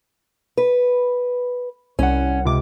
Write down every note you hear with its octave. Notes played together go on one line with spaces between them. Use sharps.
B4
C2 C#4 F#5
C#2 C3 D6